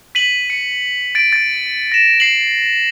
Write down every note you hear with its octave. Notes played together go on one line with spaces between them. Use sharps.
B6 D#7 F#7
C#7
A6 D7
A6
A#6 E7
C7 F#7